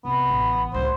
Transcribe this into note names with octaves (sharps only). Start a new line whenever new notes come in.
C2 B3
A1
C#2 D3 C5